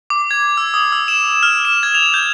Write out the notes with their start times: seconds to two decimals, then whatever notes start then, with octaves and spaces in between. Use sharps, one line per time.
0.10 D6
0.31 G#6
0.57 E6
0.74 D#6
0.92 E6
1.08 E7
1.43 F6
1.65 E7
1.83 G#6
1.95 F7
2.14 G6